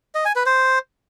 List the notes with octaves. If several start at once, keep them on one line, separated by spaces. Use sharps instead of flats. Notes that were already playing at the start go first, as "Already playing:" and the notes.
D#5
G#5
B4
C5